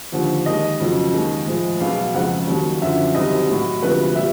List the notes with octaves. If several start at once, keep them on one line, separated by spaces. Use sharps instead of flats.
D#2 D3 F3
D#2 D#3 G#3 D#5
F2 C#3 F#3
D#2 D#3 G#3
A2 F3 G#3
E2 B2 F#3 F5
F2 C#3 F3 G#3 F#5
D#2 D#3 F#3
F#2 D3 F3 E5
C2 C3 D#3 F#3 D#5
A2 F#3
D2 C3 F3 G#3 B4
A#2 G3 E5